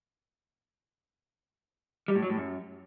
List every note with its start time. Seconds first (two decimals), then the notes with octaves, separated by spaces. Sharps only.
2.08 G3
2.15 A2
2.23 F#3
2.30 A2
2.37 F#2